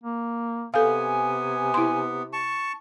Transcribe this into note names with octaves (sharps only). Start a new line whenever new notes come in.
A#3
C3 B3 A4 F5 G#5
E4 C6
A5 C#6